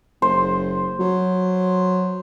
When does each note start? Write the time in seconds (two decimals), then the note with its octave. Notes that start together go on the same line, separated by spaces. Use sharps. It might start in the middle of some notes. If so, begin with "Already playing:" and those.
0.22 F#1 C5
1.00 F#3